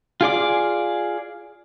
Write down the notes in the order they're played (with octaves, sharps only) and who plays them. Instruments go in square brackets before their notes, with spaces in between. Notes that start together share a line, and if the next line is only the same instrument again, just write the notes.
[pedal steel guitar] F4 G#4 D5 D6